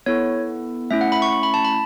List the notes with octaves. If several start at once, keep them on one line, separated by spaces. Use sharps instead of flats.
B3 E4 A4 C#5
A3 C#4 E4 E5
F#5
B5
C#6
C#6
B5
A5
B5